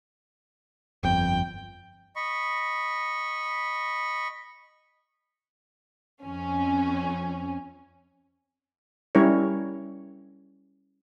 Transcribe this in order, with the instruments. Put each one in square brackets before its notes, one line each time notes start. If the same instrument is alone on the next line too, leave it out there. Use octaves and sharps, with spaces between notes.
[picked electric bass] G1 F2 [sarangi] G5
[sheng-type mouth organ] D#5 B5 C#6
[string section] F2 C#4
[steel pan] G3 C#4 E4 A#4 C#5